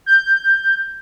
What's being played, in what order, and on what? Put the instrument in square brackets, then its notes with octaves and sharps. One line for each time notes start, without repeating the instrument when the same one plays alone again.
[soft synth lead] G6